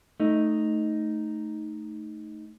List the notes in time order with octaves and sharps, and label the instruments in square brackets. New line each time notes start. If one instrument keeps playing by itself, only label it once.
[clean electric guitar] A3 D#4